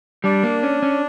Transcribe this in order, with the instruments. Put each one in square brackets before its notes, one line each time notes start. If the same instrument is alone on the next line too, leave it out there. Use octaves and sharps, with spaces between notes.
[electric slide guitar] G3 [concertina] D4
[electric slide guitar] A#3
C#4
C#4